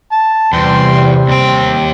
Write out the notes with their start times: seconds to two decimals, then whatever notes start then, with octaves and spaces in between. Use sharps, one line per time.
0.12 A5
0.53 E2 C3 G3 G5 C6
1.29 D#2 C4 G5